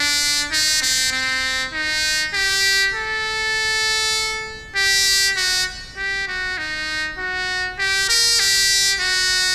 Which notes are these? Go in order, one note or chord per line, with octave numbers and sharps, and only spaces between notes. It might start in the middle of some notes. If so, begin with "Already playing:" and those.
Already playing: D4
D#4
C4
C4
D#4
G4
A4
G4
F#4
G4
F#4
D#4
F#4
G4
A#4
G4
F#4